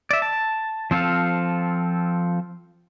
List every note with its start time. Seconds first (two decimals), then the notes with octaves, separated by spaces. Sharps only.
0.11 D5 E5
0.22 A5
0.91 F3 C4 F4 A4 F5